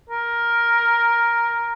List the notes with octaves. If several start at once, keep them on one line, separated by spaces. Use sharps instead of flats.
A#4